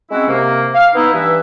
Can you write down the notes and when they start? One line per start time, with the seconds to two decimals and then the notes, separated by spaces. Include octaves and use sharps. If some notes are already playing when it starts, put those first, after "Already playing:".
0.10 G#3 C4 C#4 E4 F#4
0.28 C3 A#3
0.74 F5
0.95 B3 D#4 E4
1.14 G2 E3 B4 E5